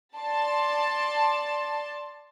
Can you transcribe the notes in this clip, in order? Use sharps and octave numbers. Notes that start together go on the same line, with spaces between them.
D5 A5 C6